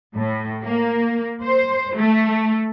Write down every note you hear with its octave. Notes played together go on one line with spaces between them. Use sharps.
A2
A#3
C5
A3